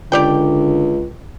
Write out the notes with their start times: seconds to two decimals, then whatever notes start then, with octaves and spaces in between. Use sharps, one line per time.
0.12 C#2 D3 G4 D5 G5